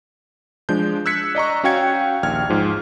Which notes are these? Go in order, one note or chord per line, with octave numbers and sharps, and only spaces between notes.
F3 G#3 D4 G6
E6 F#6 G#6 B6 C#7
D5 D#5 A#5 C#6
C#4 F#4 F5 G5 G#6 C#7
A#1 D#2 G5 F6 G#6
G#2 F3